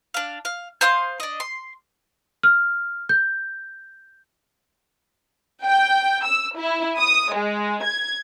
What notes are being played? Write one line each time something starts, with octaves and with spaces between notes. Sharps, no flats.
D4 F5
F5
C5 F5 C6 D#6
D4 D#5
C6
F6
G6
G5
E6
E4
D#6
G#3
G#6